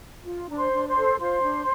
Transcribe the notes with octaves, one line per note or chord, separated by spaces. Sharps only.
F4
D4 A#5
C5 C6
D4
C5 C6
A4
F4 C5 C6
D4